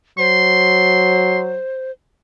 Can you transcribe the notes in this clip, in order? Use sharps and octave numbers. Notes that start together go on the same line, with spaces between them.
F#3 C5 C6